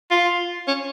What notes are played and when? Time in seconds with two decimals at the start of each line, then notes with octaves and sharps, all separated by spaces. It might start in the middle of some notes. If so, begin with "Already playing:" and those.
0.11 F4
0.68 C#4